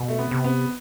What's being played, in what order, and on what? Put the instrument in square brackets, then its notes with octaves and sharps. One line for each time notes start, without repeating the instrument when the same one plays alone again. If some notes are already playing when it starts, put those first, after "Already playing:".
Already playing: [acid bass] B2
[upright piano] A3
B3
[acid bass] C3
[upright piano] B3